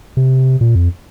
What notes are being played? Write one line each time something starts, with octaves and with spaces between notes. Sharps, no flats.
C3
A#2
F2